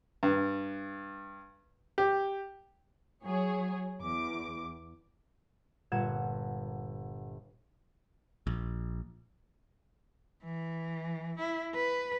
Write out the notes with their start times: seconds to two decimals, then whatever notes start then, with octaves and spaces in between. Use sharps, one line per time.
0.23 G2
1.98 G4
3.24 F#3 G#4 C#5
4.01 E2 D6
5.92 G1 A#2 F#5 G#6 E7
8.47 A#1
10.44 E3
11.39 E4
11.75 B4